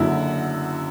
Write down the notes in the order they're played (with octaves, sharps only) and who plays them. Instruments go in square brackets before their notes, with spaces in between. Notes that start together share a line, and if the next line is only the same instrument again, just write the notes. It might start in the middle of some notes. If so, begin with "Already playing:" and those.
Already playing: [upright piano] F#1 F#2 D3 E4 F#4